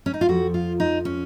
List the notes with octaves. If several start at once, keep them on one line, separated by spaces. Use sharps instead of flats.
C#4
D#4
F4
F2 F3 F#4
F4
D#4
C#4